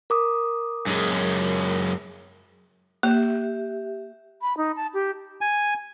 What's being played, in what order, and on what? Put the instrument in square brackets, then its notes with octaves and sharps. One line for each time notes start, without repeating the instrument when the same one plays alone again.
[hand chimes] A#4 D6 D#6
[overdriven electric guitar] F#2 G#3
[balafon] A#3 [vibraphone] G4 E5
[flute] B5
D#4
A5
G4
[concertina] G#5